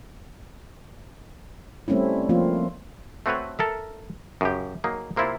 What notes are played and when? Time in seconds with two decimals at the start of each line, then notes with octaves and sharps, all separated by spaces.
1.88 G3 A3 C4 C#4 E4
2.29 F3 A3 A#3 C4 F4
3.26 A3 C4 F#4 A4 B4 C#5
3.59 A4 A#4 E5
4.41 F#2 C#3 G4
4.84 F#3 A#3 D#4 G#4
5.16 C3 A#3 C4 E4 F4